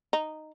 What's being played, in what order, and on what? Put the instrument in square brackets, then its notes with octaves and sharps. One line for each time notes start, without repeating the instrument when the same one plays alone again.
[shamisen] D#4